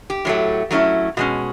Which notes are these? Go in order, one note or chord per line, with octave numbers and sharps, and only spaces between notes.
G4
A2 F#3 A3
F#3 A3 C#4 E4
B2 G#3 C#4 F#4